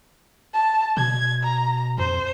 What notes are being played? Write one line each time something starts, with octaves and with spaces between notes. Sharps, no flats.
A5
B2 G#6
A#5
F2 C5